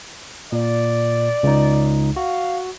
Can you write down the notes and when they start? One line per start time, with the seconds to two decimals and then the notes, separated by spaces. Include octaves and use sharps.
0.52 A#2 D5
1.43 C#2 D#4
2.16 F#4 F5